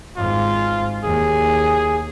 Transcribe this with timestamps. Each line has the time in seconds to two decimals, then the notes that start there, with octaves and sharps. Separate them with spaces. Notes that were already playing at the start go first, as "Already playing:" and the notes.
0.17 G#1 G#2 F4
1.04 D#2 G#4